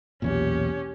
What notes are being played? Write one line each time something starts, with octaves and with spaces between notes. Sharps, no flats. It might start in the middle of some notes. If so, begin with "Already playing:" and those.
B1 E2 A#2 C#4 G4